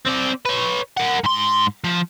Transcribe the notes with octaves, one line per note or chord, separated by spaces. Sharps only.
C4 D5
B4 C#5
A#4 F#5
G#2 C6
F3